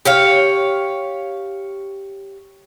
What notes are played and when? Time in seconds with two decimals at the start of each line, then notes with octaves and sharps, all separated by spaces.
0.05 G4 C#5 F5